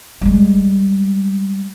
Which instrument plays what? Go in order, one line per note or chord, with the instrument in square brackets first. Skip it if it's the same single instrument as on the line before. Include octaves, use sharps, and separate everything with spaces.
[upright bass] G3 G#3